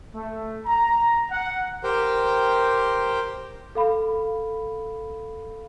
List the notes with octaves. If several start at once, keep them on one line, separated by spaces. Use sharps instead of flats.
A3
A#5
F#5
G4 A#4 C5 G5
A4 F5 B5